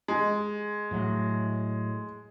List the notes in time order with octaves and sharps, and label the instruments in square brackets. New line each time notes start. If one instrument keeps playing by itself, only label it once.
[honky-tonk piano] G#3
[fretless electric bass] A2 F#3